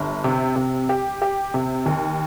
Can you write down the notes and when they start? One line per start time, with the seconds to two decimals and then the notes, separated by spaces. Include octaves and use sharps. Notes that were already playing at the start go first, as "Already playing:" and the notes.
Already playing: G1
0.24 C3
0.56 C3
0.89 G4
1.22 G4
1.54 C3
1.86 D#2